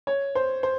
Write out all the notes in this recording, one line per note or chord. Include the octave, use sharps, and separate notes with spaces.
C#5
C5
C5